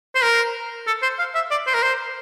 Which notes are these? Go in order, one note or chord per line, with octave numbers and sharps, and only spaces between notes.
C5
A#4
A4
C5
F5
E5
D5
C5
A#4
C5